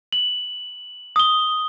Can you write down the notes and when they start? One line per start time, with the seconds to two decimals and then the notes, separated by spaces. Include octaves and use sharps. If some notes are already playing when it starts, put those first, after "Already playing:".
0.13 F#7
1.16 D#6 G7